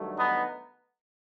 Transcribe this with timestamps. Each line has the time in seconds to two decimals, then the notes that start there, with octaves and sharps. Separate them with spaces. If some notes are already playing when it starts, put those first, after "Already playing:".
Already playing: G2 D#3 F#3 A3
0.17 B3 D#4